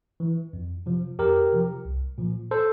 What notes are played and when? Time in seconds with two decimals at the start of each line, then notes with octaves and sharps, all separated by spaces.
0.20 E3
0.53 F2
0.86 C3 F3
1.19 F2 G4 A#4
1.52 C3 F3
1.85 C2
2.18 A#2 F3
2.51 A4 C5